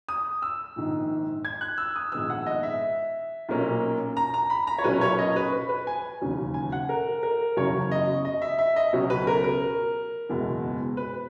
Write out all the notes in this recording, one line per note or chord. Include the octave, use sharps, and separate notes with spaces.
D#6
E6
A#1 G#2 D#3
G#6
F#6
E6
D#6
A#1 G#2 D#3 G#3 B3 E6
F#5
D#5
E5
B1 A#2 A#3 C#4
A#5
A#5
B5
A#5
C#5
B1 A#2 F#3 A#3 C#4 B4
C#5
D#5
B4
B4
B4
G#5
E1 D#2 C#3 F#3 C#4
G#5
F#5
A#4
A#4
F#1 E2 C#3 F#3 C#4 C#5
D#5
D#5
E5
E5
D#5
C#2 B2 F#3 C#4
B4
A#4
A#4
F#1 E2 B2 G#3
B4